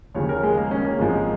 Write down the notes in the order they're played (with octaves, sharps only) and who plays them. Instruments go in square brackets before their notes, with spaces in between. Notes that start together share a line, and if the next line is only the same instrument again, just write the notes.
[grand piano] D#2 C#3 F3 C#5
A#4
G#3
A#3
C#4
A#3
G#1 G#2 F3 G#3